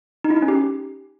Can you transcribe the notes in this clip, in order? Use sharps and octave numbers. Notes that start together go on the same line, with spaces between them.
D#4
E4
D#4
C#4
G4